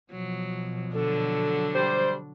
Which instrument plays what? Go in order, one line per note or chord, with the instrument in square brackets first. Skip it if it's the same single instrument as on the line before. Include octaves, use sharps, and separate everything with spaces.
[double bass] B2 F3 [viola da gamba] F#3
[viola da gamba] D3 F#3 D4 [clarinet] A4
[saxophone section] G3 C5